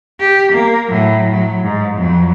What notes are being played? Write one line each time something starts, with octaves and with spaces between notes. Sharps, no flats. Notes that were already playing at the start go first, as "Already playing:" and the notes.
G4
A#3
A2 F#3
F#3
G#2
F2 F#3